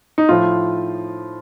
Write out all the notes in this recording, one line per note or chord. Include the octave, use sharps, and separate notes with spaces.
D#4
A2 F3 F4